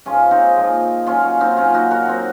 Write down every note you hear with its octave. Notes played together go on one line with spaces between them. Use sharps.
G#2 F3 G#3 C#4 F4
C4 D#4
A#2 F3 G#3
A#2 F#3 C#4 F4
C#4
C4 D#4
A#2 F#3 C#4 F4
D#4 F#4
F#4 A#4
F#3 C4 D#4